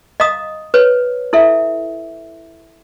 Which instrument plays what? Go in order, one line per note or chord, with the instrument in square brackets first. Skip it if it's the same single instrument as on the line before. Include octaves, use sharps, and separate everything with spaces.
[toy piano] D#5 F5 A#5 D#6
B4 C#5
E4 A4 E5